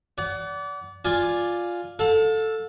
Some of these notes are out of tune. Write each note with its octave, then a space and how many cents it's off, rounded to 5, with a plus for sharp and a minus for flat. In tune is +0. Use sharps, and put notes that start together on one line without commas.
D5 -30 F#5 +20
F4 +0 D5 +0 G#5 +0
A4 +0 F5 +40